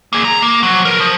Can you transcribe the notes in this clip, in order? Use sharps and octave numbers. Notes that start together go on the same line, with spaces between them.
A#3 G#4
A#5
A#3
F3 F#3
A#4 B4
F3